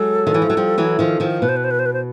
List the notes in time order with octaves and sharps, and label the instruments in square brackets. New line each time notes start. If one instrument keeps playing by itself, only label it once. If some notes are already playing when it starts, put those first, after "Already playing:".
Already playing: [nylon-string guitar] F#3 G#3 [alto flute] A4
[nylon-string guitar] D#3
E3
F3
F#3
F3 G3
E3 F#3
D#3 F3
D#3 F3
[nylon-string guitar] B2 [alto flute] B4
[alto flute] C5
B4
C5
B4
C5
B4
C5